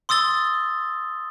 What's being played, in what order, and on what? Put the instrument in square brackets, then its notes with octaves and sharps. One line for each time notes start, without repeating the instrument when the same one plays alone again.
[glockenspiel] C6 D#6 E6 A6 G7